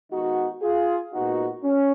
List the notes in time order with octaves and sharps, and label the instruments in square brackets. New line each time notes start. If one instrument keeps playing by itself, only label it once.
[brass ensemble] D#3 G#3 B3 D#4 F#4
F4 G#4
A#2 G#3 B3 D#4 F#4
C#4